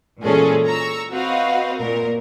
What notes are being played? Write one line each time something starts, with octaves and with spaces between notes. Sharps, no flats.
A#2 E3 G#3 C#4 G#4 A4
A#5 C#6 E6
C4 F#4 B4 D#5 F5
A#2 A#4